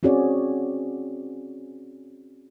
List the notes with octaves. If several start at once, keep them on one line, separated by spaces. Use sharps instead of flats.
C4 C#4 F#4 G#4 C#5 D5